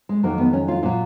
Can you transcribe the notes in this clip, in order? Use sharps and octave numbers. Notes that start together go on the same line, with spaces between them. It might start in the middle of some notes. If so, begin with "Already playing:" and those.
G#3
F2 D#3 F#3 A#3
B3
C#4
F4
A#2 F#3 F4